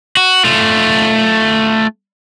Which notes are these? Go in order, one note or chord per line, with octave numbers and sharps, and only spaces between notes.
F#4
A3 F4